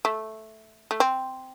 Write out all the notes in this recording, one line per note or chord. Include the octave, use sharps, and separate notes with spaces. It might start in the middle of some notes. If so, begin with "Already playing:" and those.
A3
A3
C4